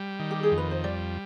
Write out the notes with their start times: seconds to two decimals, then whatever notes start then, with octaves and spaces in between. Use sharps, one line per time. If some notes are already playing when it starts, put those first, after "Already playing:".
Already playing: G3
0.19 D#3
0.31 G4
0.43 G#4
0.51 F2
0.58 B4
0.71 C5
0.84 G3 D5